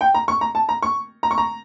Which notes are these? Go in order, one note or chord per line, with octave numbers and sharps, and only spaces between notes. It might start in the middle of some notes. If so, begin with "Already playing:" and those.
G5
A#5
C#6
A#5
A5
A#5
C#6
A#5
C#6
A#5